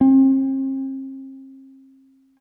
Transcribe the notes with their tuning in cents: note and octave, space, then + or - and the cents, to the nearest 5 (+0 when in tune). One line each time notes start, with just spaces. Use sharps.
C4 +40